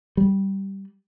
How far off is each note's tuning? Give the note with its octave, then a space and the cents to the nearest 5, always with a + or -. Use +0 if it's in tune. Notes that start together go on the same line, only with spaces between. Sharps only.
G3 -10